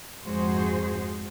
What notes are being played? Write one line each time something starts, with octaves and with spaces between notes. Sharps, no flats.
F2 G#2 F#4 G#4 C5